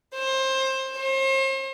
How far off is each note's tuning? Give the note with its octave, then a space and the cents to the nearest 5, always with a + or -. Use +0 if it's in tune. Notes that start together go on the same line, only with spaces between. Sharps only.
C5 +20
C5 +40